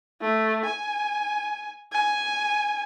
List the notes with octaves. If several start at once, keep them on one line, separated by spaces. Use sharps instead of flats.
A3
G#5
G#5